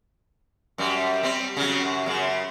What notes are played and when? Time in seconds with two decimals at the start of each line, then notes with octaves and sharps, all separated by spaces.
0.78 F#2 G3
1.23 G3 C4
1.57 C#3 F#3
1.82 F#2
2.06 F#2 C#3